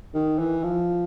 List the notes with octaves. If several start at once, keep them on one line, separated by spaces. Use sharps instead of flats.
D#3
E3
F3